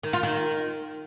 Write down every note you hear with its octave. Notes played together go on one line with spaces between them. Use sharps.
D#3
F4
D#3